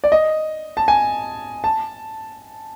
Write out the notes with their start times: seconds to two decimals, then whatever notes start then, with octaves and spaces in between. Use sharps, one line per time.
0.04 D5
0.12 D#5
0.77 A5
0.88 G#5
1.64 A5